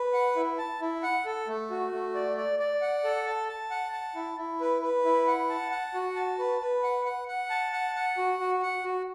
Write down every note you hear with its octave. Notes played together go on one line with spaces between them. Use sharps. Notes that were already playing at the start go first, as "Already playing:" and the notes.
Already playing: B4
F#5
E4
A5
E4
F#5
A4
A3
F#4
A3
D5
D5
D5
F#5
A4
A5
A5
F#5
A5
E4
E4
B4
B4
E4
F#5
A5
F#5
F#4
A5
B4
B4
F#5
F#5
F#5
A5
F#5
F#5
F#4
F#4
F#5
F#4